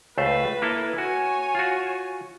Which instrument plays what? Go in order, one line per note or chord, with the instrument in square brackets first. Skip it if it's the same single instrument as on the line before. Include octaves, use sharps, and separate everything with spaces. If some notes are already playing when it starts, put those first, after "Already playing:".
[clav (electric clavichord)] C#2 A3 C5 [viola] B4
[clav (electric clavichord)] A#3 E4 A4
[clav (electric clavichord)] F#4 [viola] C#5 G#5
[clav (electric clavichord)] F4 F#4